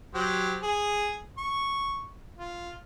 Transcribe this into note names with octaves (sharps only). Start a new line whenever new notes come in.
F#3 G4 C5
G#4
C#6
F4